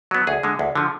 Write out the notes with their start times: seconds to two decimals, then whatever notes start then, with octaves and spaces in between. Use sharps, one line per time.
0.11 F#3 B3
0.27 D2 G#4
0.43 D3 G#3
0.59 D2
0.75 D3 F3